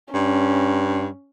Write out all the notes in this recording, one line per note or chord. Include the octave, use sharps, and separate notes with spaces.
G2 C#4